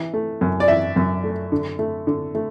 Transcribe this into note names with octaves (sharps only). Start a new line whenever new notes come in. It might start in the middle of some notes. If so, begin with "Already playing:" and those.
Already playing: E3
A3
F#2
D5
E3 E5
F#2
A3
D3
A3
D3
A3